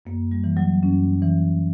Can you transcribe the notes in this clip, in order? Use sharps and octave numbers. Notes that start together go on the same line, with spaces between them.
F#2 A#3
G3
E3
F#3
F#2 C#4
E3